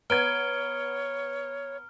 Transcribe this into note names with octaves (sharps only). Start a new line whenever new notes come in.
B3 C#5 A#5 F6 G#6 D7 D#7 G7